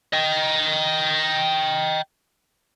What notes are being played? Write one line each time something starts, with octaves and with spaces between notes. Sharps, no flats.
D#5 G5